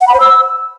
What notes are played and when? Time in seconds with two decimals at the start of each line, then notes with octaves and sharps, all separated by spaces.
0.01 F#5
0.07 B5
0.14 C5
0.20 E6